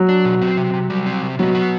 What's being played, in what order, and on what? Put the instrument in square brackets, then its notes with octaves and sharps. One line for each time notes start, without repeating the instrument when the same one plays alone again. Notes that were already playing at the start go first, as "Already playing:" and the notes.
Already playing: [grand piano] F#3
[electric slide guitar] D4
B2
C4
C3
C3
G3
C4
C3
[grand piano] F#3 [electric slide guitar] B3
[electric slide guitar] F#4